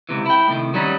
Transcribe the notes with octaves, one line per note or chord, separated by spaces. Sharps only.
C#2 C3 E3
E4 G5
A2 C3 D#3
D#3 F#3 G3 C#4 D#4